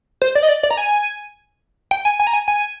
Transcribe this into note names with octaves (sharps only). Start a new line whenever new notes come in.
C5
D5
D#5
D5
D5
A#5
G#5
G5
G#5
G#5
A#5
G#5
G#5